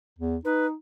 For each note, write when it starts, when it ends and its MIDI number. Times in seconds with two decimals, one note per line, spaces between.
0.19 0.36 40
0.45 0.74 63
0.45 0.66 71